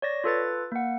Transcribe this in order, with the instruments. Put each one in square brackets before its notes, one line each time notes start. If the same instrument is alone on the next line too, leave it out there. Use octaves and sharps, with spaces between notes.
[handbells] C#5 D5 A#6
F4 A4 B4 A6
A#3 F#5